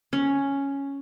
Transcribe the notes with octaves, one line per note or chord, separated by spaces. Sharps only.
C#4